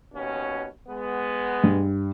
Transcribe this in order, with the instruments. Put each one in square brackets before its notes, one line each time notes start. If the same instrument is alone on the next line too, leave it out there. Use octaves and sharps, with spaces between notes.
[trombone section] D#2 B2 C#4
G#3 B3
[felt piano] G2